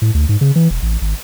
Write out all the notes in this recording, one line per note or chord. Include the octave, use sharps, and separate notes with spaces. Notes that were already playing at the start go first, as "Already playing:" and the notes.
A2
D2
G#2
C#3
E3
E1
A1
G#1